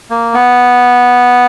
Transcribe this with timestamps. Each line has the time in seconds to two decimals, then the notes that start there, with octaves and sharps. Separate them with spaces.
0.10 A#3
0.34 B3